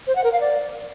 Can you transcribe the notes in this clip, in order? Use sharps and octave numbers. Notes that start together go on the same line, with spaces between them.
C5
F#5
A#4
F5
D5